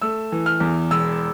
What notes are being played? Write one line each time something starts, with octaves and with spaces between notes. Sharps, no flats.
A3 E6
E3
F6
E2
E1 E6